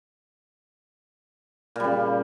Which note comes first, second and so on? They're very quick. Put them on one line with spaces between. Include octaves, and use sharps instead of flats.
A#2 G3 C#3